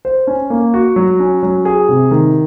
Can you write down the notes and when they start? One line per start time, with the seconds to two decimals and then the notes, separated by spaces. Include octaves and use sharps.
0.05 C5
0.27 C#4
0.50 A#3
0.74 F#4
0.96 F#3
1.20 C#4
1.43 F#3
1.65 G#4
1.89 C3
2.11 D#3